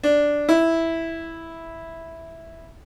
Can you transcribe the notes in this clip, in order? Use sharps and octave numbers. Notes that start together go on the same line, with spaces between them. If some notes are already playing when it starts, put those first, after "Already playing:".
D4
E4